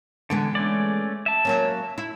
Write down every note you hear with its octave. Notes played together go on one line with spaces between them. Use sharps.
D3 E3 G#3 B3
A3 C#4 D5
E5 A5
F#3 A#3 C#4
E4